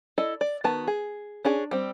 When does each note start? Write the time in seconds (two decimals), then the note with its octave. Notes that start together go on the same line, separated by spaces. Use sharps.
0.18 E4 A4 D5 D#5
0.41 D5
0.64 D#3 B3 F#4 A5
0.87 G#4
1.45 C#4 D4 G#4
1.71 G3 C4